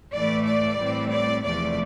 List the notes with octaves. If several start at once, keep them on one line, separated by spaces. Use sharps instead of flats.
A2 E3 A3 D5
D5
A2 E3 G3 C4
D5
E2 C3 F3 A3 D5